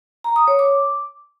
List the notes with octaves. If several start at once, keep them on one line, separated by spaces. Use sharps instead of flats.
A#5
D#6
C#5
D6